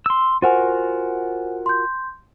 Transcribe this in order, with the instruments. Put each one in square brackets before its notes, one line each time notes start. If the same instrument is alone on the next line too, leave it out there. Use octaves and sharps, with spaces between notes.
[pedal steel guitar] C6 E6
[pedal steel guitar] F4 F#4 A#4 [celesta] C5 F#5 G#5
[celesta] C6 G6